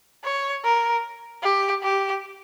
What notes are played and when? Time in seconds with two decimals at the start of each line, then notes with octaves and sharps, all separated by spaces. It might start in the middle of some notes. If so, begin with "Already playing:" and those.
0.24 C#5
0.64 A#4
1.43 G4
1.83 G4